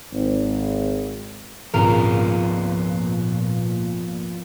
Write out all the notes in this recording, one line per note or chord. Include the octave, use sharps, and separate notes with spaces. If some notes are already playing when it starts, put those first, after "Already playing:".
G#1
G#1 C#2 A#2 F3 B3 F4 A#4